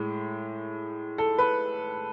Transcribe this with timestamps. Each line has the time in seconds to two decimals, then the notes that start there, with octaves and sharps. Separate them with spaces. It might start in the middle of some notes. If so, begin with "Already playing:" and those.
Already playing: A2 G#3
1.18 A4
1.38 B4